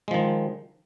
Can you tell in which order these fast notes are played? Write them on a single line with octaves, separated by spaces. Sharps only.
G#3 F3 D#3